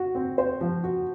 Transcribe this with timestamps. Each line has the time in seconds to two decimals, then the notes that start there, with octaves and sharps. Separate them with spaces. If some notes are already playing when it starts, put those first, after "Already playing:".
Already playing: F#4
0.15 C4
0.38 C5
0.61 F3
0.84 F#4